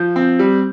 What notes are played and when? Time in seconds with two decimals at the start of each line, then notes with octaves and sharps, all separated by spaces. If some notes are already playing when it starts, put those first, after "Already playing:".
Already playing: F3 G6
0.16 C4
0.39 G3